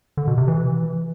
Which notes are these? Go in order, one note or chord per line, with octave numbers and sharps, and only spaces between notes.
D3
B2
C3
E3